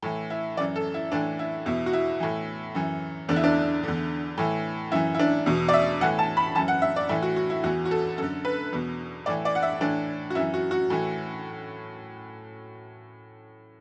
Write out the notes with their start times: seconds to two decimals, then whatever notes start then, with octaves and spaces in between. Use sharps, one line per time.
0.02 A2 E3
0.30 E4
0.57 F#2 E3 D5
0.76 A4
0.94 E4
1.12 A2 E3 D4
1.39 E4
1.66 E2 B2 E4
1.86 F#4
1.93 E4
2.20 A2 E3
2.75 F#2 E3
3.29 E2 D3 D4
3.36 E4
3.44 D4
3.83 E2 D3
4.38 A2 E3
4.92 F#2 E3 E4
5.14 E4
5.19 D4
5.46 E2 B2
5.69 D5
5.73 E5
6.01 A2 E3 F#5
6.19 A5
6.37 B5
6.55 F#2 E3 A5
6.68 F#5
6.82 E5
6.96 D5
7.09 A2 E3 E4
7.22 F#4
7.36 F#4
7.50 E4
7.64 E2 E3 F#4
7.85 F#4
7.91 A4
8.18 F#2 D3 A4
8.45 B4
8.73 E2 B2
9.26 A2 E3 D5
9.45 D5
9.55 F#5
9.63 E5
9.81 A2 E3 D4
10.30 F#4
10.35 F#2 E4
10.39 E3
10.54 F#4
10.71 F#4
10.90 A2 E3